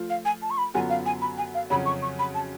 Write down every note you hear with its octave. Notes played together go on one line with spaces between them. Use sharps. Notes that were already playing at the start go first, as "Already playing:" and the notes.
Already playing: F3 A3 F4
F5
G#5
A5
C#6
B5
F#2 D3 F#3 B3 F4 G#5
F5
G#5
B5
G#5
F5
F2 C#3 F#3 C#4 F#4 B5
C#6
C#6
B5
A5